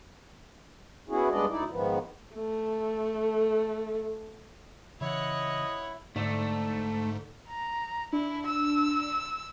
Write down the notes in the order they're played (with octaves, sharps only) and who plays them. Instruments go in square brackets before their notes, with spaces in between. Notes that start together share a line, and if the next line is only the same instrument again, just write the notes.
[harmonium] B3 C#4 E4 F#4 G#4
G2 G#3 B3 D4 D5 D#5
D2 D#4 E4 D5
G#2 D#3 F3 B3
[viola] A3 A4
[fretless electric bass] C#3 E3 [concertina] E4 [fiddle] C#5 F#5 [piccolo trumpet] D#5
[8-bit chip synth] G#2 [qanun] D3 [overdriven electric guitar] A3
[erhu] A#5
[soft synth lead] D4 [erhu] E4
[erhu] E6